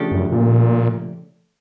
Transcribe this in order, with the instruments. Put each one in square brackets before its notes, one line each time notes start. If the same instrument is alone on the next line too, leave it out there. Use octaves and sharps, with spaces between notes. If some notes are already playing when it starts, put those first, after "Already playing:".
Already playing: [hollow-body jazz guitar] C#3 F3 A3 D4 G4
[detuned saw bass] F#2
A#2